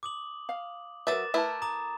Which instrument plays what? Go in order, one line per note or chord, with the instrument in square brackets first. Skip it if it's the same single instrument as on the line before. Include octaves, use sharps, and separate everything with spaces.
[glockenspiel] D6 D#6 F#7
[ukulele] F5
[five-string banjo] F#3 E5 [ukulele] A#4 B4 [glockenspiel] D6 A6 E7
[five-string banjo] A3 E4 A#4 [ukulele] B4 A5
[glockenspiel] A#5 D6 D#6